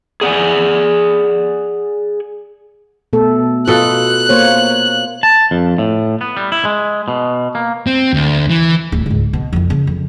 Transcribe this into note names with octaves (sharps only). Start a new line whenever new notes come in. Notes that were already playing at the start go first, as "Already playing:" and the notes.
G#4 D5 F#5 G#5
B2 A3 A4
B2 F4 A4 F#6
A#3 C5 C#5
A5
F2
A2
B3
G3
E4
G#3
B2
A#3
C4
D2
E3
D1 C#4
C#2 G#2
B2
F2 E3
C#3
F2